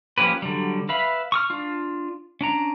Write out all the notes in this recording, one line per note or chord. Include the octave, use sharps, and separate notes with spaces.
F3 A#3 C#4 G4 B4
D3 F#3 G3
B4 E5 F5 B5
C#6 D#6 F6
D4 F4
C#4 D4 A#5